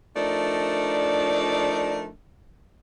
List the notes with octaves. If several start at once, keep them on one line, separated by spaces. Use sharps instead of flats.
F3 A3 D4 D#4 A#4 D5